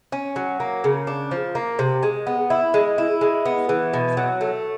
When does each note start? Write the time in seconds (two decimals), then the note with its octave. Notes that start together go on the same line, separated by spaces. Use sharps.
0.12 C#4
0.36 F#3
0.60 A#3
0.84 C#3
1.07 D4
1.31 F3
1.55 A#3
1.79 C3
2.03 G#3
2.27 B3
2.50 E4
2.74 G#3
2.98 E4
3.21 G#3
3.45 B3
3.69 E3
3.93 B2
4.17 F#3
4.41 A3